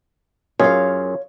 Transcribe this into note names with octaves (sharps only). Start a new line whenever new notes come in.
F#2 F4 G#4 C#5 F5